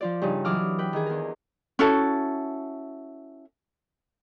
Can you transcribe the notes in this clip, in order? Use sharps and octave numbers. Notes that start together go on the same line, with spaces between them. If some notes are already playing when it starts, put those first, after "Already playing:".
F3 F4 D5
G2 C#3 D#4
E3 F#3 D6 D#6 F6
B4 G5
D#3 G#4
E2 A#4
C#4 E4 F#4 A4